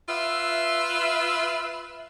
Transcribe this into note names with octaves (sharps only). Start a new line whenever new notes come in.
F4 B4 E5